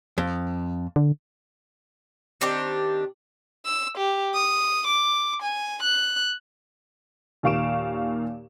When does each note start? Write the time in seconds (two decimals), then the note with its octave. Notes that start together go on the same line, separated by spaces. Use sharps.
0.18 F2
0.96 D3
2.41 D#3 C4 D4 G4
3.66 E6
3.98 G4
4.34 D#6
4.87 D6
5.42 G#5
5.83 F#6
7.43 D#2 A#2 F5 C#6 D7 E7